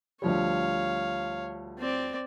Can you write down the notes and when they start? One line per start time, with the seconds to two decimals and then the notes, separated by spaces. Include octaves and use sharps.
0.22 D2 F3 G3 C#5 F5
1.79 C4 D5